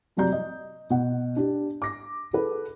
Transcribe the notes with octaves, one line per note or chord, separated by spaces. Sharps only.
F2 C3 F#3 D5 A#5 G6
D#5
B2 F#5
D4 G4
D6 A#6
G#4 A4 B4